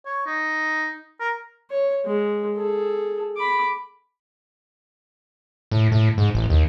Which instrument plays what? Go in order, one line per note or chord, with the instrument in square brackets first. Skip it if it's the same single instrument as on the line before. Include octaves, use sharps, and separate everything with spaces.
[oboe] C#5
D#4
A#4
[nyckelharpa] C#5
G#3
G#4 A4
B5 D6
[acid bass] A2
A2
G#2
A1
D#2